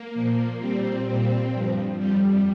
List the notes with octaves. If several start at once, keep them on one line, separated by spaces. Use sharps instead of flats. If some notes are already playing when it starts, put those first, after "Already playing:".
Already playing: A#3
A#2 F3
A#2 G3 C4
A#2 G3 C4
G2 F3
F2 F3 G3